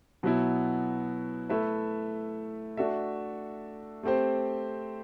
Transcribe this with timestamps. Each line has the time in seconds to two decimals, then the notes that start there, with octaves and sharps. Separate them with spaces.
0.23 B2 F#3 B3 E4
1.50 A3 E4 B4 E5
2.77 A3 D4 F#4 A4 E5
4.03 A3 C4 G4 C5